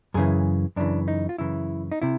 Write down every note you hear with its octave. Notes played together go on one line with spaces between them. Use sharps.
F#2 C#3 E3 G#4
F#2 C#3 E3 D4
D#4
F4
F#2 C#3 E3 E4
D#4
C3 E4